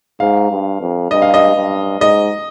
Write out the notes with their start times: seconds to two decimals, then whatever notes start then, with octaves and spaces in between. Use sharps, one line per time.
0.20 G#2 F5
0.51 G2
0.81 F2
1.11 G2 D#5
1.22 F5
1.34 D#5
1.56 G2
2.00 G#2 D#5